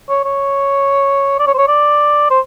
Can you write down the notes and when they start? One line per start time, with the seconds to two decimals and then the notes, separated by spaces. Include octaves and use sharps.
0.09 C#5
0.25 C#5
1.39 D5
1.47 C#5
1.54 C5
1.58 C#5
1.68 D5
2.30 C5